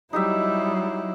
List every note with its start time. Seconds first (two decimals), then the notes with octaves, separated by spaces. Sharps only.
0.13 F#3 G3 D#4 E4 G4 E5